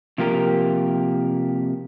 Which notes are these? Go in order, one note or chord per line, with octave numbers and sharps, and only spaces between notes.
C3 F3 A#3 G4 A#4